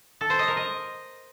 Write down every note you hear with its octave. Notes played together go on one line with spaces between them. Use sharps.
A4
C5
D#5
A#4
D#5